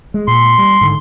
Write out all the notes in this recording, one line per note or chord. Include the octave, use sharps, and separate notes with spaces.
G#3
A#2 C6
G3
G#2 D3